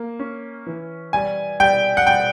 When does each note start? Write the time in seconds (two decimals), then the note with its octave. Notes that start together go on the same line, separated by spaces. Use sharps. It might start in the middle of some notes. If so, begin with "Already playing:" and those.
Already playing: A#3
0.19 C#4
0.67 E3
1.13 G3 G#5
1.60 G3 G5
1.97 F#5
2.07 G3 G5